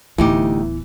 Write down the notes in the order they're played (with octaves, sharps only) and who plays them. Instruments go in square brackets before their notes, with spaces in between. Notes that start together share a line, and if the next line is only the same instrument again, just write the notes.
[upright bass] D1 B3 [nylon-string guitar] D2 D#4 G4 [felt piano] E3